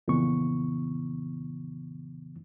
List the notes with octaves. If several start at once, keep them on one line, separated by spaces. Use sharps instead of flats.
F2 A#2 C#3 E3 B3 C#6